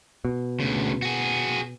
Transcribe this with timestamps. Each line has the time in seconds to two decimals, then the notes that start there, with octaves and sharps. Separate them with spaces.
0.25 B2
0.60 D2 C#3
1.02 F#4 G#4